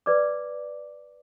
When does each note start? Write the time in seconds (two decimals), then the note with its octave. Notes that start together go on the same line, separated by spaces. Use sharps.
0.06 B4 D5 D6